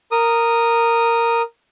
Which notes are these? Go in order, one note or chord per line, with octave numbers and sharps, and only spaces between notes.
A#4 D#6